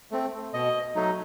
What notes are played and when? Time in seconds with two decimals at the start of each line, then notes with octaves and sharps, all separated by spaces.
0.11 A3 C4
0.54 B2 D#5
0.96 F#3 A3 D#4